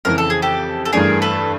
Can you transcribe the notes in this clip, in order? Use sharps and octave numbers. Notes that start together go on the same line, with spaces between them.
F2 C#3 E3 A#4
A4
G#4
G4 A4
A4
G2 E3 A3 D4 G#4 A#4
A4 B4